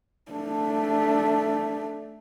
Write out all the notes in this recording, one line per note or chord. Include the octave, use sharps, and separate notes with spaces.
A3 D4